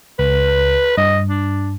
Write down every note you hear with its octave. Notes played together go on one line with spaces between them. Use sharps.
C#2 B4
G2 D#5
D4